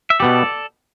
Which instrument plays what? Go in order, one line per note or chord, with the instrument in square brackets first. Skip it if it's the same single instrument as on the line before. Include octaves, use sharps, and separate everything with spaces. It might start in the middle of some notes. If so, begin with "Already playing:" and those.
[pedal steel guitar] E5
[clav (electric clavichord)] B2 B3 G4 [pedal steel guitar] A4 D5